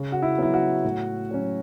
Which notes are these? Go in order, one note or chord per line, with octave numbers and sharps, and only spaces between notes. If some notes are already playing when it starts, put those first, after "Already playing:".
Already playing: C#3
F#4
E4
F#3 B3 E4
F#4
A2
F#3 C#4